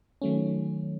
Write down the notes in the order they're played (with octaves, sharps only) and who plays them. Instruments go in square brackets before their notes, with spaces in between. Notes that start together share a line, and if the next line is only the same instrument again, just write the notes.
[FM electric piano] D#3 F#3 A3 C#4